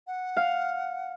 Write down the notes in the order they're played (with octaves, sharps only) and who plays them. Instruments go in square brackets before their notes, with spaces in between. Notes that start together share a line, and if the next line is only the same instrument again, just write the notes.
[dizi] F#5
[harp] F5